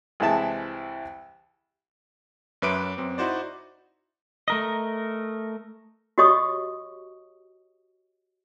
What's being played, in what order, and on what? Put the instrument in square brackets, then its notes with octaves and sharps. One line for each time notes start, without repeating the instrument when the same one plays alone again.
[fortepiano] C2 E3 G#3 E5 A5
[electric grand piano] F#2 C#4 B4 E5 D6 D7
F#2 C4
D#4 E4 F#4 C5 D5
[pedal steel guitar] A3 A#4 D#5
[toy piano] F#4 G4 C#5 D#5 C#6 D#6